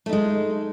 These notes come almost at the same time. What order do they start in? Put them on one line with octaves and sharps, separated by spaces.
A3 D#4 G#3